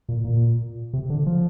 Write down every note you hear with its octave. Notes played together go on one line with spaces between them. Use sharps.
A#2
A#2
C3
D3
F3